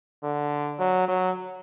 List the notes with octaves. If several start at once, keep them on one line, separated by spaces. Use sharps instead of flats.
D3
F#3
F#3